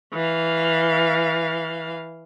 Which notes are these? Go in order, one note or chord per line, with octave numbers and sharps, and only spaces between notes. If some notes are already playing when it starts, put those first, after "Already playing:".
E3 F5